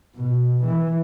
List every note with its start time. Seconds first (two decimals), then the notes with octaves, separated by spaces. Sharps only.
0.16 B2
0.64 E3